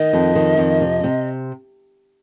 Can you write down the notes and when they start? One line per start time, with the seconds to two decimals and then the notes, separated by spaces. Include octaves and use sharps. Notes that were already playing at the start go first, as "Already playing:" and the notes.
Already playing: D#3 D#5
0.13 F2
0.35 D#3
0.58 F2
0.81 C3
1.03 C3